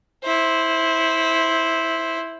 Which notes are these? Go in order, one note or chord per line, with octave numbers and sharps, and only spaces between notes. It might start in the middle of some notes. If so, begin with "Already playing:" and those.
E4 C5